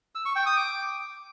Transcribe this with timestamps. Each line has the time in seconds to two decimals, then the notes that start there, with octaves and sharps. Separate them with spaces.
0.15 E6
0.25 C#6
0.36 G5
0.46 D#6
0.56 D6